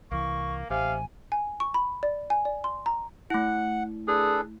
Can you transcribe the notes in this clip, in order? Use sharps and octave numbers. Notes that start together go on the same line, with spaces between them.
C2 E3 A#3 C#6
A1 C3 F5 G#5
G#5
C#6
B5
D5
G#5
D5
C6
A#5
A3 E4 F#5 F#6
D4 G#4 A4 B4